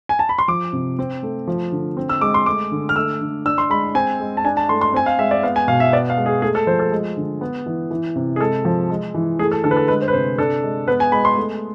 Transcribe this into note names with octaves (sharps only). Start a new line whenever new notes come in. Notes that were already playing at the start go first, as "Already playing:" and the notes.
G#5
A5
B5
C6
F3 D6
C3
C4
A3
F3
D3
C4
E6
G#3 D6
C6
A3 D6
D3
F6
A3 E6
D3
D4 E6
C6
G#3 B5
C4 G#5
G#3
A5
D4 G#5
A5
A3 C6
C6
C4 G#5
F5
G#3 E5
D5
B3 F5
G#5
B2 F5
E5
B3 D5
F5
G#3
G#4
A3 G#4
A4
F3 C5
A4
G#3
D3
B3
E3
E3
C3
G#4
G#3 A4
F3
G#3
E3
A3 G#4
A4
D3 A4
B4
A4
G#3 B4
C5
B4
C3 C5
D4 A4
G#3
B3 B4
G#5
G#3 B5
C6
A3